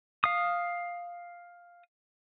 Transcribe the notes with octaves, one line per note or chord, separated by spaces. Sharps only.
F5 D#6